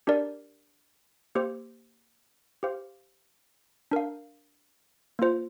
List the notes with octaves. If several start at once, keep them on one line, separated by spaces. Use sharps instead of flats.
D4 G4 A#4 D5
A#3 G4 C5
G4 C5 F5
D4 A#4 F5
A#3 F4 C5